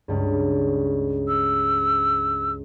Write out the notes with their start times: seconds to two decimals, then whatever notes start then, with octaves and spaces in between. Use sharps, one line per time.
0.08 C#2 G2
1.28 E6